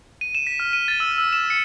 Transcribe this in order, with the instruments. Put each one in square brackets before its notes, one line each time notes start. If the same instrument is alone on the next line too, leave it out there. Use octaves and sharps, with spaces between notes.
[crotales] D#7
E7
B6
F6
D#7
A6
E6
E6
E7
C#7